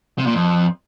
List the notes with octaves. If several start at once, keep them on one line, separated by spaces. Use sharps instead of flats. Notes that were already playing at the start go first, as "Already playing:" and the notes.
C3
A#2
F2